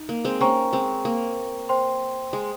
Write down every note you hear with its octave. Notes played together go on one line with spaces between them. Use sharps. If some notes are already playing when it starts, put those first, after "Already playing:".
Already playing: D#4
A#3
G#3 C4
A#3 C#4 C5 G5 A#5 C#6
G#3 C4
A#3
C5 G5 C6
G#3